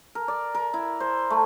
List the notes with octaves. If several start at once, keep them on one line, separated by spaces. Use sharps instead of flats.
A#4
D5
A#4
E4
C5
A3